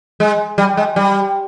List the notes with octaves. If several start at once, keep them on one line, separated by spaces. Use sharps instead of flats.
G#3
G3
G#3
G3